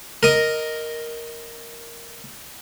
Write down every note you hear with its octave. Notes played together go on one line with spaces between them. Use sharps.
A#4 D#5